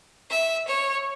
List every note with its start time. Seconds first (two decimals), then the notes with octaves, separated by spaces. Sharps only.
0.31 E5
0.68 C#5